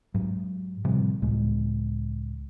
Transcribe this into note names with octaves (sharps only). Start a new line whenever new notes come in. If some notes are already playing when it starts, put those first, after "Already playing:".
G#2 F#3
A2 C3 F3 G3
C#2 A2 G#3